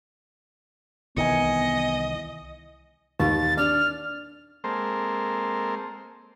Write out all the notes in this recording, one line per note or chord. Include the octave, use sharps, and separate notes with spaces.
C2 D#3 E3 B3 D#5 G#5 C#7
D#2 A6
D4 F6
G#3 A#3 C4 A4 A#4 C5